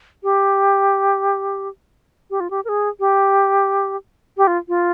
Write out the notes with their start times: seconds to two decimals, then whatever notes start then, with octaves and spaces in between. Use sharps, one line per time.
0.23 G4
2.31 G4
2.40 F4
2.50 G4
2.65 A#4
2.69 G#4
3.00 G4
4.37 G4
4.47 F4
4.68 F4